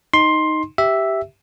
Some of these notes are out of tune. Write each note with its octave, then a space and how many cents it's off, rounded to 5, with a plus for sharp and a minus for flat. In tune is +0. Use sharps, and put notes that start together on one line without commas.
D#4 +0 C6 +10
G4 -5 E5 +0